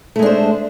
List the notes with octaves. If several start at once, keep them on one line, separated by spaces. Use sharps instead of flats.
G#3 A3 D4 C5